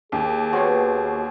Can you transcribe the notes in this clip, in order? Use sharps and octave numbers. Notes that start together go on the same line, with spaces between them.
D#2 G4 G#4
B3 C#4 F#4 G4 C5 C#5